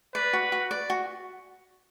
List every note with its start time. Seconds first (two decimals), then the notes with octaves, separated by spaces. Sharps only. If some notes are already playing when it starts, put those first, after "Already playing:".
0.15 B4 D5
0.33 F#4
0.52 F#4
0.71 D5
0.90 F#4